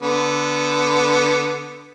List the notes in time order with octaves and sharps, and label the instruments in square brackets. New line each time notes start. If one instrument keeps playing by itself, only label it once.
[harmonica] D3 B3